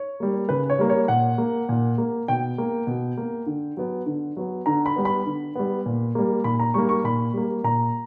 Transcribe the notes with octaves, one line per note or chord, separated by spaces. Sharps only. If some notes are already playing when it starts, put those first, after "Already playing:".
Already playing: C#5
G3 A#3
C#3 B4
C#5
G3 A#3
C#5
A#2 F#5
A#3
A#2
A#3
B2 G5
A#3
B2
A#3
D3
F#3 B3
D3
F#3 B3
D3 A#5
B5
G3 B3
B5
D3
G3 B3
A#2
G3 A#3
A#2 B5
A#5
G3 A#3 C#6
C#6
A#2 B5
G3 A#3
A#2 A#5